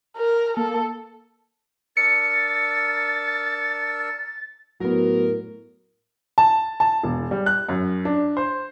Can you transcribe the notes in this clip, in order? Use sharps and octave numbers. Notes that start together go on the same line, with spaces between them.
A#4
A#3 A4
D4 A#4 E6 A6 C#7
A2 F#3 B3 A#4
A5
A5
E1
G3
F#6
F#2
D4
C5